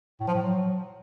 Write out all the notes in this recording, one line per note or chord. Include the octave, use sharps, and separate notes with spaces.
A2
F3
A2
F#3